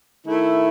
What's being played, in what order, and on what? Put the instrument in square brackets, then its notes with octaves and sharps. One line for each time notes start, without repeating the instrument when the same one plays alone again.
[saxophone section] D#3 A3 E4